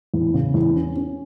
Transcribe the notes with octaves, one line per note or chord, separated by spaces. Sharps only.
E2
C#3
E2
C#4
C#4